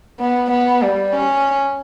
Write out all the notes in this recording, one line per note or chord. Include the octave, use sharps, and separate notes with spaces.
B3
B3
G3
C#4